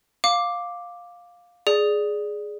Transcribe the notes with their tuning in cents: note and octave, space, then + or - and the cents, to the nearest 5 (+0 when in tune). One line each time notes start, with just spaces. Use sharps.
F5 +10 D6 +0
G#4 +5 D5 +0